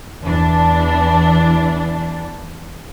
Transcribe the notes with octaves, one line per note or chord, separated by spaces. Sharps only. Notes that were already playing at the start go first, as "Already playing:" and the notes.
E2 E3 D4